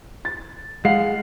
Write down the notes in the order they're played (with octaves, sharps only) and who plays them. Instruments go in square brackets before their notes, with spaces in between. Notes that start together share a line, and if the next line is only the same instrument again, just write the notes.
[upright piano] A6
[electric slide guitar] G#3 [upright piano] F5 F#5 C7